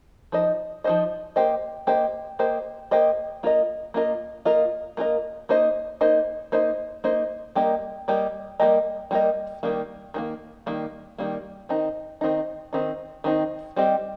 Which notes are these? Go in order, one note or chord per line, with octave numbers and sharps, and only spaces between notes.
F3 D#4 C5 D#5
F3 D#4 C5 D#5
A#3 G4 C5 D#5
A#3 G4 C5 D#5
A#3 G4 C5 D#5
A#3 G4 C5 D#5
A#3 F4 A#4 D#5
A#3 F4 A#4 D#5
A#3 F4 A#4 D#5
A#3 F4 A#4 D#5
A#3 D#4 C5 D#5
A#3 D#4 C5 D#5
A#3 D#4 C5 D#5
A#3 D#4 C5 D#5
G3 A#3 G4 A#4 D#5
G3 A#3 G4 A#4 D#5
G3 A#3 G4 A#4 D#5
G3 A#3 G4 A#4 D#5
D#3 G3 A#3
D#3 G3 A#3
D#3 G3 A#3
D#3 G3 A#3
D#3 C4 D#4
D#3 C4 D#4
D#3 C4 D#4
D#3 C4 D#4
G3 C4 G4 D#5